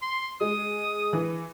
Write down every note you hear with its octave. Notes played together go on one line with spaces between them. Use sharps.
C6
G#3 D#6
E3